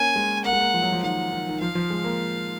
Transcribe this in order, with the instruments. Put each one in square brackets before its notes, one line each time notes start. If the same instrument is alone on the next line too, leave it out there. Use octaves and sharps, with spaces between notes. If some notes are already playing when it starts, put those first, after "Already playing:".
Already playing: [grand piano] A#3 C#4 [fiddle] G#5
[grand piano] G#3
[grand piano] A#3 [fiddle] F#5
[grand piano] G#3
A#3
F3
F#3
F3
[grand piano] D#3 [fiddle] F#5
[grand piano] D#3
D#3
[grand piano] F3 [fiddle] F5
[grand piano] F3
G#3
A#3